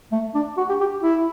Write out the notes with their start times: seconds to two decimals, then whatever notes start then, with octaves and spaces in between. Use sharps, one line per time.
0.12 A3
0.35 D4
0.57 F#4
0.69 G4
0.81 G4
1.03 E4